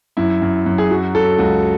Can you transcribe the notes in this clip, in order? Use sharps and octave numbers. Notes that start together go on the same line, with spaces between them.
F#2 E4
F#2
F#2
G#4
F#3 F#4
F#3 A4
C#2 F#4